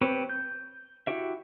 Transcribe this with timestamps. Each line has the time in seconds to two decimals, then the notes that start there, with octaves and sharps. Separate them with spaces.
0.01 C4 G4 B4 C#5
0.29 G6
1.07 E4 F#4 G4 E5